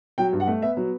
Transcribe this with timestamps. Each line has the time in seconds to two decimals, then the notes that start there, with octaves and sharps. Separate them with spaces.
0.18 F#3 G5
0.33 G2
0.40 F#5
0.48 A3
0.62 B3 E5
0.77 F#3